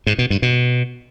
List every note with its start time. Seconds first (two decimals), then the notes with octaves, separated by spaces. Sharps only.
0.07 G#2
0.18 B2
0.30 G2
0.42 B2